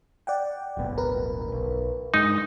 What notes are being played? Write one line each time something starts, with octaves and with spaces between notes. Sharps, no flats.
D5 F#5 G5
D1 G1 B2
A#4 B4
B1
G2 G#3 D#4